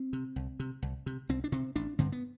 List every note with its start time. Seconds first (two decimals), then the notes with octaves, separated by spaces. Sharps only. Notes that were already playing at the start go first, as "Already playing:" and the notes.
Already playing: C4
0.13 C3
0.36 C2
0.60 C3
0.82 C2
1.06 C3
1.29 C2 C4
1.44 D4
1.52 C3 C4
1.76 A1 D4
1.99 G2 D3 C4
2.12 B3